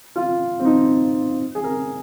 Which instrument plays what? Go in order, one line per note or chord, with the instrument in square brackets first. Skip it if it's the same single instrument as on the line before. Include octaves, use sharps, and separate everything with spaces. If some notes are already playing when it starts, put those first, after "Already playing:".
[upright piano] F4
C4
D#4
G#4
A#4